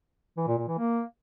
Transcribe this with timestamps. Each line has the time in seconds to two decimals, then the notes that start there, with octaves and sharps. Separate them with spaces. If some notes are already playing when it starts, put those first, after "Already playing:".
0.37 E3
0.47 A#2
0.58 A#2
0.68 E3
0.78 A#3